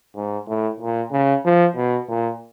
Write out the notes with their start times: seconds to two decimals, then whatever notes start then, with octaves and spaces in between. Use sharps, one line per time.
0.16 G#2
0.47 A2
0.80 A#2
1.12 C#3
1.45 F3
1.76 B2
2.09 A#2